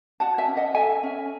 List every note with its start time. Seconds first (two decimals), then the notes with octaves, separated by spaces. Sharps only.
0.20 F#4 F#5 A5
0.38 E5 G#5
0.48 C#4
0.57 D#5 F#5
0.75 A4 E5 G#5
1.03 C#4